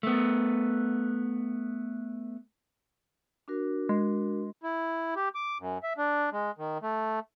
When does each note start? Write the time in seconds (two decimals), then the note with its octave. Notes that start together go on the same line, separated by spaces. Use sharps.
0.03 A3 B3
3.48 D4 F#4 A#4
3.89 G#3
4.63 E4
5.16 G4
5.35 D6
5.60 F#2
5.83 E5
5.98 D4
6.32 G#3
6.58 D#3
6.82 A3